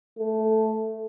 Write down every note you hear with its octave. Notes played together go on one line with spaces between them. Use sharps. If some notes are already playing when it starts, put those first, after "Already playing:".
A3